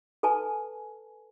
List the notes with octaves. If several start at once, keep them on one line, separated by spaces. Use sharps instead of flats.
A4 B4 G#5 A5